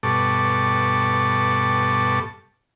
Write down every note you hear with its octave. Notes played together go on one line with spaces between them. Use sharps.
G2 B2 A4 C#6 D6